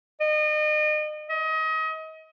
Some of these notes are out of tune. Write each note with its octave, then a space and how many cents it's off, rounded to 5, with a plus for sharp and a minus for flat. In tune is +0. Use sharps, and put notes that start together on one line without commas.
D#5 -35
D#5 +30